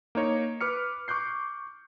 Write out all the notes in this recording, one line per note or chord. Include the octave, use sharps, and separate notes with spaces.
A#3 D#4 C#5
B4 D6 F6 C#7
C#6 D6 F#6 G6 C7